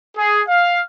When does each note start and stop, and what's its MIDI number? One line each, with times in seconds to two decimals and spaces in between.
0.16 0.41 68
0.48 0.81 77